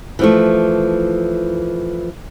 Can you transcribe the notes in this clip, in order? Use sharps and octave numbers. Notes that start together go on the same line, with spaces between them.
E3 F3 A3